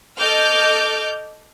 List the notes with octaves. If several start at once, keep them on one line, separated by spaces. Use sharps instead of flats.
A4 D#5 D6 F6 G6